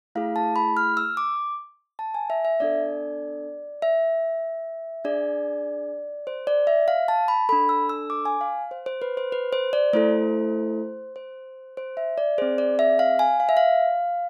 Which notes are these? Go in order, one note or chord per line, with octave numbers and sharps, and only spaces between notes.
A3 E4 G#4 F5
A5
B5
F6
E6
D6
A5
G#5
E5
E5
B3 D4 A4 D5
E5
D4 G#4 D5
C5
D5
E5
F5
A5
B5
D4 A4 B5
E6
E6
D6
G#5
F5
C5
C5
B4
C5
B4
C5
D5
A3 E4 A4 C5
C5
C5
E5
D5
C4 G#4 C5
D5
E5
F5
G#5
F5
E5
F5